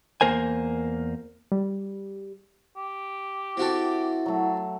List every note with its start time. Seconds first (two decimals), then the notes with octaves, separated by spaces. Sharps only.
0.21 E2 F3 A#3 A#4 C5 G#5
1.52 G3
2.77 G4
3.57 C4 E4 F#4 A4
4.26 F#3 A3